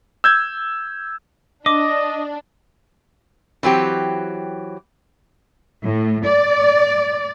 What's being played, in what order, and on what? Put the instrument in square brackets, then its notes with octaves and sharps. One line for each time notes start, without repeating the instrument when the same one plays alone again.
[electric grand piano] E6 G6 G#6
[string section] D4 [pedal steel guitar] D#5 [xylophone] D6
[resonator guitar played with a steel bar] E3 F#3 C4 G4
[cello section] A2
D5